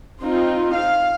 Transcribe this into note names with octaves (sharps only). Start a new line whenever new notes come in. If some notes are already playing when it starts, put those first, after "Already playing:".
C4 D#4 F4
F5